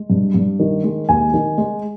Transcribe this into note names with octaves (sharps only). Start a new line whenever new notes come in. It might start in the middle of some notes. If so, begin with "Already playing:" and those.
Already playing: G#3
G2
G2
D#3
G#3
D#2 G#5
D#3
G#3